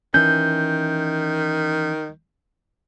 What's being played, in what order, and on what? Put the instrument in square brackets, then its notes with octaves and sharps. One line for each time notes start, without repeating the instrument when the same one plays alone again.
[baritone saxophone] D#3 [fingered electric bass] E3 C#4 [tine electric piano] G6